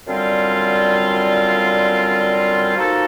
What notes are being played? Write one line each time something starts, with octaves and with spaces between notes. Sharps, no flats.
F#2 D3 G3 C4 F4
F3 A#3 D#4 F#4 A4